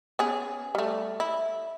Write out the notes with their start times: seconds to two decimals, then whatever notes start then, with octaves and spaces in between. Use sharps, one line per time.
0.19 B3 C#4 G#4
0.75 G3 A3
1.20 E4